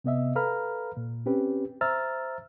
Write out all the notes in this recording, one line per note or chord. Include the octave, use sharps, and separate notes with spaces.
C3 B3 D#5 E5
A4 B4 F5 A#5 B5 F6
A#2
C4 C#4 G4 B4
C5 E5 A#5 E6 F6 A6